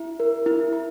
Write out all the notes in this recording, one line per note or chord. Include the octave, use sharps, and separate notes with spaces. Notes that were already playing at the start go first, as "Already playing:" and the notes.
Already playing: E4
A#4
E4
E4